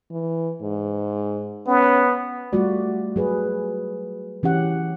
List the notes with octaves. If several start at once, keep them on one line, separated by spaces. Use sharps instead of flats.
E3
G#2
B3 C#4
G3 A3 F4 F#4 D5
F#3 G#4 B4
E3 C#4 G4 F#5